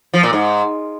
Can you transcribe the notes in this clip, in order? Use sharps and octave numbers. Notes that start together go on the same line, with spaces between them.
F3
A#2
G#2